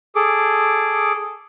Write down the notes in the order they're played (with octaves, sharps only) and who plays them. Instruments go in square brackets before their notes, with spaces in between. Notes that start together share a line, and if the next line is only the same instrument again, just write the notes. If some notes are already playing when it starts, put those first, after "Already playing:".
[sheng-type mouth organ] G#4 A4 D6